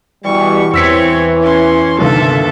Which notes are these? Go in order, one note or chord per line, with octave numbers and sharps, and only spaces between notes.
B2 E3 G3 C#6
E2 E3 C4 C#5 E6 B6 C#7
C#4 C6
G1 D#2 C3 A4 E5